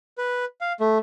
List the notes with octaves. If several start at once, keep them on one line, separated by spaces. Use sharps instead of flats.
B4
F5
A3